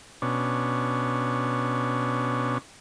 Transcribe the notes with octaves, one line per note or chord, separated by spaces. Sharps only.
B2 C#4 D4